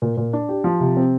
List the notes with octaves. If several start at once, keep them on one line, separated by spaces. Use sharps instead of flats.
A#2
A#2
D4
G4
F3
C3
C4